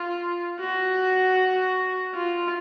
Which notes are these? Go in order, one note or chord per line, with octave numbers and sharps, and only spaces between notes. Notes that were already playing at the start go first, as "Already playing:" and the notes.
Already playing: F4
F#4
F4